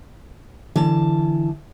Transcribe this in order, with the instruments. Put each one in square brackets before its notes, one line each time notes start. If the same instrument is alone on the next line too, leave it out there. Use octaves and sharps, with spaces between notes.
[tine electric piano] D3 [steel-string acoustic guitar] E3 A5